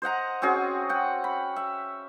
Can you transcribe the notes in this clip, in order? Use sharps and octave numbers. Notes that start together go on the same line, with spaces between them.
C5 D#5 F#5 A#5
C4 C#4 F#4 G#4
F#5 G5
B5
E5